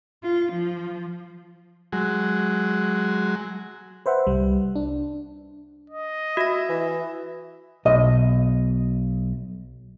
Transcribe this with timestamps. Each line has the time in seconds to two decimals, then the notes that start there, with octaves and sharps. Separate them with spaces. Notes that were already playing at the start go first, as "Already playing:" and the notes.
0.24 F4
0.52 F3
1.92 F#3 G#3
4.06 B4 C5 E5 F#5
4.27 C2 G3
4.76 D4
5.90 D#5
6.37 F#4 E5 A#6
6.69 E3
7.85 B1 D#5